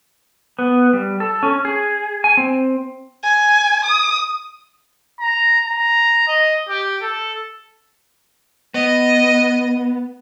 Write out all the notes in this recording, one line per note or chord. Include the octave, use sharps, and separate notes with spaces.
B3
G3
A4
C#4
G#4
G#5
C4
G#5
D#6
A#5
A#5
D#5
G4
A4
B3 D#5